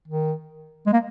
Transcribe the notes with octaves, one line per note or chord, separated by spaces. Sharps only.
D#3
G#3
A#3